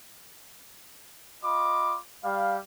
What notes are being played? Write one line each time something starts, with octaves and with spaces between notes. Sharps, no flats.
F4 D#5 B5 D6
G3 F5